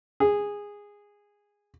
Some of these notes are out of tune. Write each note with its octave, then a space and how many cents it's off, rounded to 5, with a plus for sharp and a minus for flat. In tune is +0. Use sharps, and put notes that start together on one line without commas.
G#4 -15